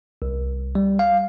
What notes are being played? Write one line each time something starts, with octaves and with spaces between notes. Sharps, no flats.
C2
G3
F5